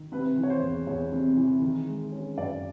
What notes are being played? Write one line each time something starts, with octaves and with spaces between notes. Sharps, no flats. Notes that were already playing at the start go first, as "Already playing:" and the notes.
Already playing: D#3
C3 B4
E3
C#5
C5
E2
E2 C#5
C3
E3
D#3
G#3
C#4
F#2 D5